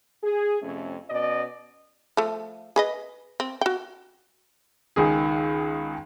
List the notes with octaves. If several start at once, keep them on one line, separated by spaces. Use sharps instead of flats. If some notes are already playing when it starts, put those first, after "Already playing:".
G#4
F2 C3 A3 C#4
B2 C#4 D5 D#5
F3 A3
G#4 B4 D#5
C4
F#4 G5
C#2 D#3 G#4